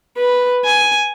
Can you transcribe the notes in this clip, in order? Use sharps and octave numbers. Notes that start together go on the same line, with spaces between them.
B4
G#5